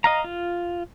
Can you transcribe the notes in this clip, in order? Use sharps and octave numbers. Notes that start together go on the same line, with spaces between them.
D#5 F5 A#5
F4